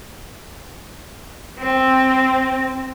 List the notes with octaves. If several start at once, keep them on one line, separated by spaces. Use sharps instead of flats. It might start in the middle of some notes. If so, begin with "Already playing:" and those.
C4